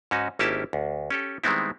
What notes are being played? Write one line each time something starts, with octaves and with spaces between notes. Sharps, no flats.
G#2 C#4 D#4 F#4
G#1 A#3 C#4 E4 G4 A5
D2
C#4 G4 A4
D#3 G3 G#3 B3 C4 E4